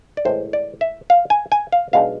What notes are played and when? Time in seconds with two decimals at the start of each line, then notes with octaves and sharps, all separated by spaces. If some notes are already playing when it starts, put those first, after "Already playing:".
0.17 D5
0.25 A2 E3 G#3 C5
0.53 D5
0.81 E5
1.10 F5
1.30 G#5
1.52 G#5
1.72 F5
1.93 B1 B2 G#3 D4 F5